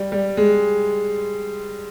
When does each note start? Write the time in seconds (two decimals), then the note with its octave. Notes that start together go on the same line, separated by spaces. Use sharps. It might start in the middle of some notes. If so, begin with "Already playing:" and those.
Already playing: G3
0.12 G3
0.37 G#3